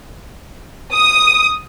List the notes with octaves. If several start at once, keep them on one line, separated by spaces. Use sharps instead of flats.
D#6